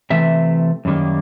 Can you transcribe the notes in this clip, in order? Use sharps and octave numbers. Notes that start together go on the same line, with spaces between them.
C3 E3 A3 E5
F#2 D#3 G3 A#3